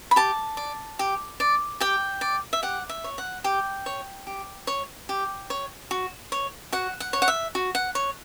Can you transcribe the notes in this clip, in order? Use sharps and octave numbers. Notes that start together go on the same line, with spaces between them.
B5
G4 A5
D5
G4
D5
G4 G5
D5
E5
G4 F#5
E5
C#5
F#5
G4 G5
C#5
G4
C#5
G4
C#5
F#4
C#5
F#4 F#5
F#5
C#5
F#5
E5
F#4
F#5
C#5